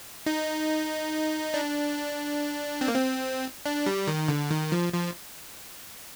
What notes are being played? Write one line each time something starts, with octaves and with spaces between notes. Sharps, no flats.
D#4
D4
C4
A#3
C4
D4
G3
D#3
D3
D#3
F3
F3